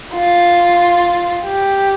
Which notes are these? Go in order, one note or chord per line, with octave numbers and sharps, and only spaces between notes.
F4
G4